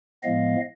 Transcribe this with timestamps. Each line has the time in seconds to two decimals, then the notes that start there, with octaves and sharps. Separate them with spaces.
0.23 A2 F3 G#3 B3 D#5 F5